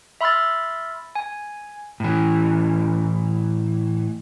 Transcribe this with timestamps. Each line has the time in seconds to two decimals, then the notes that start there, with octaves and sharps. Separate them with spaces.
0.21 E5 B5 C6 E6 F6 A6
1.15 G#5
2.00 A2 E3